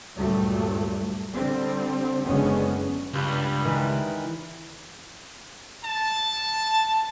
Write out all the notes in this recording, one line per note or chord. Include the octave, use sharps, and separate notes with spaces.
D2 G2 A#2 F#3 G3 A3
D3 G3 C4
F#1 D3 G#3 B3 C#4
C#2 G2 B5
D#3 E3 G#3
A5